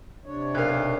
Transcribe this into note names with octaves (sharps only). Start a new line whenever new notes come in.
C3 D4 C#5
B1 A#4 F5 F#6